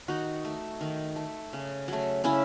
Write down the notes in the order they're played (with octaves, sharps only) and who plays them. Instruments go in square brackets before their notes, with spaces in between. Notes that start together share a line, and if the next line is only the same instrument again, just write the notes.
[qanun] D#3 D#4 F#4
A3
D#3
A3
C#3
F#3 A3
C#3 C#4 E4